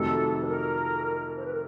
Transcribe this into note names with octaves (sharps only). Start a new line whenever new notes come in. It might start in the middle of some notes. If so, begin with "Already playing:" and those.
Already playing: F2 C3 D#3 F#3 A3 A4
B4
A#4
C5
B4
A#4